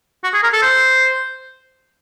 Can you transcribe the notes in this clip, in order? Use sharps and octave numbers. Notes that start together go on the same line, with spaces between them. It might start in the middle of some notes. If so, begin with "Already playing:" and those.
F#4
G#4
A#4
A4
C5